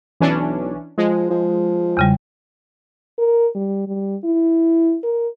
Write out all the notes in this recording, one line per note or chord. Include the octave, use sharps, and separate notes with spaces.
B1 E3 C#4 D4
F3 G#3
F3
E2 C#3 G3
A#4
G3
G3
E4
A#4